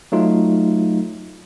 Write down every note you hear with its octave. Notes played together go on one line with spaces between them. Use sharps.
F#3 A3 D#4 F4